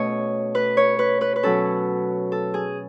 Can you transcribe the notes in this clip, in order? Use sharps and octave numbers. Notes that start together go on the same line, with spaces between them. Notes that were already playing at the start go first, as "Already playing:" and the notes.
Already playing: B2 A3 C#4 C#5 D#5
B4
C#5
B4
B4
B4
B2 F#3 C#4 A4
A4
G#4